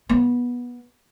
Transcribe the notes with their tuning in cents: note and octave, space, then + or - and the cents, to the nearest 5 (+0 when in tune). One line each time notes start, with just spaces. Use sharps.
B3 -15